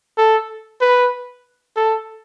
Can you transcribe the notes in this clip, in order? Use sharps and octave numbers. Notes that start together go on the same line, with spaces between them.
A4
B4
A4